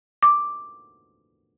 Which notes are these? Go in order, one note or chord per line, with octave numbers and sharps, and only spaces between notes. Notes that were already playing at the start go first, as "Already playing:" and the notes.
D6